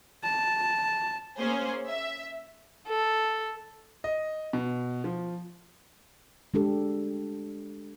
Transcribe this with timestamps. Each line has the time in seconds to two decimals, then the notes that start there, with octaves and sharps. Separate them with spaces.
0.23 A5
1.37 A#3 C#4 G#4 C5
1.88 E5
2.88 A4
4.04 D#5
4.53 B2
5.04 F3
6.54 G#3 D4 G4 A4